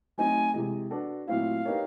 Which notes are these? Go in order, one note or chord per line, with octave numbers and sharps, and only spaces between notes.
F#3 A3 C4 D#4 G#5
C3 E3 G#3
B3 D4 F#4 A4
A#2 F#3 A3 C4 E4 F5
B3 D#4 G4 A#4 C#5